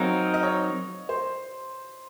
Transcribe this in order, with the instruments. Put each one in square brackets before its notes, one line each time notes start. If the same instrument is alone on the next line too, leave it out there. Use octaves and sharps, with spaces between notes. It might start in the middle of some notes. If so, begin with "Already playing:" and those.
Already playing: [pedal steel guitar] F#3 C4 D#4 A#4 [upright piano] C#5 F5
[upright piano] D#5
C#5
C5